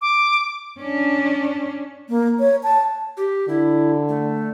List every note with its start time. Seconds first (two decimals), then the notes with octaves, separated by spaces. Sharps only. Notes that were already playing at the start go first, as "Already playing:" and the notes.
0.01 D6
0.80 C#4 D4
2.09 A#3
2.40 C#5
2.63 A5
3.17 G4
3.48 D3 E4
4.09 A3